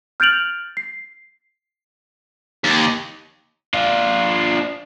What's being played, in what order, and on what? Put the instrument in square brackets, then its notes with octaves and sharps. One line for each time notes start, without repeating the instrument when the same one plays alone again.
[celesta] F6 G6 A6 D7 F7 F#7
C7
[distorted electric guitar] D#2
[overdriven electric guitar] D4 F4